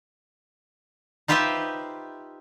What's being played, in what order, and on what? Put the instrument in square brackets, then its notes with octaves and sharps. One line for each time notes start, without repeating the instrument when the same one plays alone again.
[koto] D#4 F4 G4 B4 C5 E5